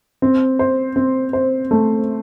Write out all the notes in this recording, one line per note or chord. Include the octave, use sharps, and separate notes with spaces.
C4
C5
C4
C5
A3